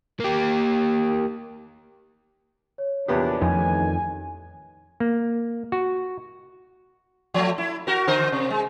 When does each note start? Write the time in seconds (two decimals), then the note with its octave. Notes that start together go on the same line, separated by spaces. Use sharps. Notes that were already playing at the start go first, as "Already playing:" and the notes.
0.20 A#3 G4
2.78 C#5
3.08 A#1 E2 B3 D4 G4
3.41 A1 F2 D#3 G#5
5.00 A#3
5.72 F#4
7.34 F3 A3
7.58 E4
7.87 F#4 A#4
8.07 D3 A#4 C5
8.32 C3
8.50 G#3